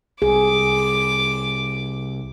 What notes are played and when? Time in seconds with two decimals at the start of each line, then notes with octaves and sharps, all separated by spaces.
0.22 C2 G#4 D6